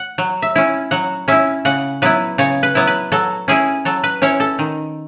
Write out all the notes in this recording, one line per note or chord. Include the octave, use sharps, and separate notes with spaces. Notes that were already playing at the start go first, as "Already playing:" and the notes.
Already playing: F#5
F#3
E5
C#4 E4
F#3 F#5
C#4 E4 E5
C#3 F#5
F#3 B3 E4 B4
C#3 C#5
B4
F#3 B3 E4
B4
F#3 A4
C#4 E4 G#4
F#3 A4
B4
C#4 E4 C#5
A4
D#3